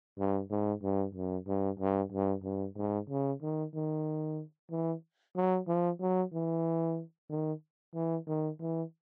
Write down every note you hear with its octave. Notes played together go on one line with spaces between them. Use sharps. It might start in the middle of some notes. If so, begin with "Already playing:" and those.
G2
G#2
G2
F#2
G2
G2
G2
G2
G#2
C#3
D#3
D#3
E3
F#3
F3
F#3
E3
D#3
E3
D#3
E3